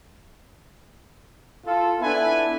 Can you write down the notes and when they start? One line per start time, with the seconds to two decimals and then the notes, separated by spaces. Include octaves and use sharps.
1.66 F4 A4
2.01 B3 D4 E4 A4 B4 G#5